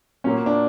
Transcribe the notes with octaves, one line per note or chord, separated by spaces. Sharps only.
A#2 F#3 A#3 C#4
D4